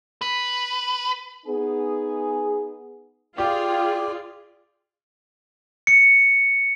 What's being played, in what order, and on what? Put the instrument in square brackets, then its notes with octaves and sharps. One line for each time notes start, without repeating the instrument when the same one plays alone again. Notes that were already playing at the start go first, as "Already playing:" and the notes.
[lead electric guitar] B4
[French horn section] B3 D#4 G#4
[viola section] F4 G#4 [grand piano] G4 [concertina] D5 [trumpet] G5
[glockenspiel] C#7